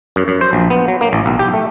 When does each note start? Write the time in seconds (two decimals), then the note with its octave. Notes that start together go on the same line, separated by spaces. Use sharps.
0.16 F#2
0.28 F#2
0.41 C5
0.53 A#1
0.70 B3
0.88 F#3
1.01 A#3
1.13 A1
1.26 B1
1.39 G4
1.54 A3